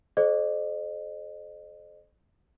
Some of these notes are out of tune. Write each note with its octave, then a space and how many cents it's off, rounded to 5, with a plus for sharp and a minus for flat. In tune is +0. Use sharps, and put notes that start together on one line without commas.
A4 -45 C5 +15 D#5 -40